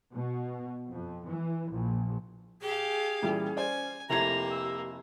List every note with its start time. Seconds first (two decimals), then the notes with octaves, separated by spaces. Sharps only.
0.14 B2
0.90 F2
1.28 E3
1.72 A#1
2.62 G4 G#4 F5
3.22 A#2 E3 G3 C#4
3.57 C5 D5 G#5
4.10 F1 A#3 E4 G4 A#5 G#6
4.51 E6